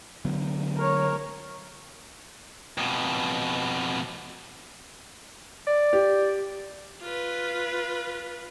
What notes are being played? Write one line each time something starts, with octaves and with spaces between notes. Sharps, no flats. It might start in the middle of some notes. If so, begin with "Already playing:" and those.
D3 F#3 B3
A#4 C#5
F2 B2
D5
G4
F4 B4